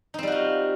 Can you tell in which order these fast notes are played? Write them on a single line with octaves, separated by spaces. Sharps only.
D#4 C4 G3 F#4 F4